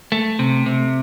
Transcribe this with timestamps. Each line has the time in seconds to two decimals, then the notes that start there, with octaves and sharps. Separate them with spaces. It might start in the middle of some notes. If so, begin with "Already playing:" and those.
0.12 A3
0.39 C3
0.66 C3